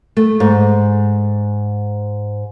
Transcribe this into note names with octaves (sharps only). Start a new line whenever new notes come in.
A3
G#2